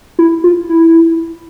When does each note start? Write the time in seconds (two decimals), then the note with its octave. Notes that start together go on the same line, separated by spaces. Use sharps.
0.19 E4
0.44 F4
0.69 E4